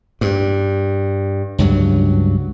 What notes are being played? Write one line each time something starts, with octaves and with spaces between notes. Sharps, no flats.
G2
C#2 G2 F#3